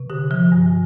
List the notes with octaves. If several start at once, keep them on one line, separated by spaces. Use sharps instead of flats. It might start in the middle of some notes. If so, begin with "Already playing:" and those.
Already playing: C3
D3 G4
F3
G2